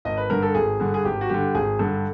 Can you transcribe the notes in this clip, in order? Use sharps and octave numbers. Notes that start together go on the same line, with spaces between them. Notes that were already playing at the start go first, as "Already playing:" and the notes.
G#1 D#5
B4
G2 D3 A#4
A4
G#1 G#4
G2 D3
G#4
G#1 G4
F#4
G2 D3 G4
G#1 G#4
G2 D3 A4